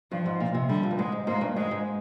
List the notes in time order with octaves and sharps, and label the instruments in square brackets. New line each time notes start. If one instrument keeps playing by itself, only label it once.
[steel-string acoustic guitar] G2 [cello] F3
[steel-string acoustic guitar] G#2
A#2
C3
[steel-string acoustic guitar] D3 [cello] G3
[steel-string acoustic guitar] A#2
G2
[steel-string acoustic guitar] G#2 [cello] G#3
[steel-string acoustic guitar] G#2
[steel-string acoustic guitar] G#2 [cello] A#3
[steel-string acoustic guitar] G2
[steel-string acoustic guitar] G#2 [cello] G#3
[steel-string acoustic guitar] G#2